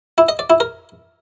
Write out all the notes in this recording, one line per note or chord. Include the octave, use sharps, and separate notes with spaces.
E4
D#5
D5
E4
A#4